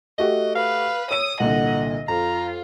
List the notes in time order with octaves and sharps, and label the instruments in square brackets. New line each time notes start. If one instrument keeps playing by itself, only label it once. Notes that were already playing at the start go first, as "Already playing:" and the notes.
[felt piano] A3 F#4 G4 [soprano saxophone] D#5
[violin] B4 [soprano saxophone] F5
[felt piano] C#5 E6 D#7 [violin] D#6
[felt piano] C2 A#2 D3 [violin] D#5 [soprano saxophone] F#5
[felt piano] F2 [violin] F4 [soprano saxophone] A#5